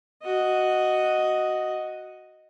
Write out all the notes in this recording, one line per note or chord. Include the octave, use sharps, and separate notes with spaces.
F#4 D#5